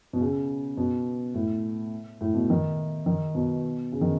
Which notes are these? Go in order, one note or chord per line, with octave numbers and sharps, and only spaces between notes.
B2
C#3
B2
A2
A2
B2
D#3
D#3
B2
C#3
D#3